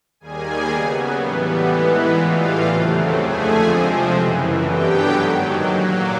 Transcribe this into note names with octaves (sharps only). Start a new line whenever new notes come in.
D#2 D#3 G3 A#3 G#4 G#5
C#3 F#3 B3
A2 E3 G3 B3
G#2 E3 G#3 B3
A2 E3 G3 F4 F5
D#2 C#3 F#3 A3 C4
F2 D3 F3 A3 G#4 G#5
C3 F3 G#3 C4
F#2 C#3 E3
G2 D3 F#3 B3 G4 G5
G#2 D#3 F#3
A#2 F#3 A#3